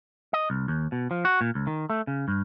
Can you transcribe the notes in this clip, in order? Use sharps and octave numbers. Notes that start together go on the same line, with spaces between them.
D#5
C2
D#2
B2
F3
F#4
A#2
C#2
D#3
A3
C#3
G2